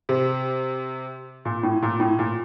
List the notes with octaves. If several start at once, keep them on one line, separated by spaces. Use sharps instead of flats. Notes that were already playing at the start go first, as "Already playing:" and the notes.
C3
A#2
A2
A#2
A2
A#2